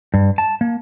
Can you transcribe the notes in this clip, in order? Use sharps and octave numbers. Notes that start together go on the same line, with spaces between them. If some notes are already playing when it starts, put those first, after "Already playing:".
G2
A5
A#3